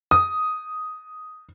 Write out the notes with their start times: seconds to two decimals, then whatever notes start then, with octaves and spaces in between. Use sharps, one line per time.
0.11 D#6